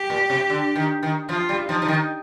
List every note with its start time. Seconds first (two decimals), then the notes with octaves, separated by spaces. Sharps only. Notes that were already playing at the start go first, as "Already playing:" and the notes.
Already playing: G4
0.10 A#2
0.30 C3
0.50 D3
0.76 D#3
1.03 D#3
1.29 F3 F4
1.49 G3
1.68 F3 D#4
1.82 F3
1.88 D#3